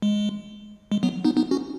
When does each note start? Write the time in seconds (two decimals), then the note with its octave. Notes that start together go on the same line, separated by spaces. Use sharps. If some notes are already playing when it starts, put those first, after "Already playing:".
0.02 G#3
0.92 G#3
1.03 F#3 B3
1.25 B3 D#4
1.37 B3 D#4
1.51 C#4 F#4